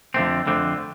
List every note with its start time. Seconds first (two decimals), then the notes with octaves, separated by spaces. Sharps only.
0.14 F2 D3 A3 C4
0.47 F2 D3 A3 C4